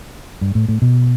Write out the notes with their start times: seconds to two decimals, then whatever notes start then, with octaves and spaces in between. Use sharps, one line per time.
0.41 G2
0.55 A2
0.68 A2
0.82 B2